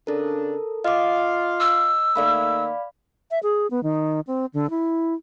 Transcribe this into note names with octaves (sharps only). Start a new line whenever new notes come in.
C#3 D4 A4 A#4
F4 D#5 F5 D6
E6
D#3 A3 A#3 D5 F5 B5
E5
G#4
B3
D#3
C4
D3
E4